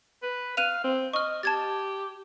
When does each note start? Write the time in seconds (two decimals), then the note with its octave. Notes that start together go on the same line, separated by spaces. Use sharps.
0.23 B4
0.57 F5 F#6 D#7 F7
0.84 C4
1.13 D#5 C#6 F6
1.43 G4 A5 G#6 A6